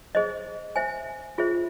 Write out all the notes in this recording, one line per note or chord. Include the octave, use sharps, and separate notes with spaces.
G#4 C5 D#5
C5 E5 G#5
F4 G#4 C5 E5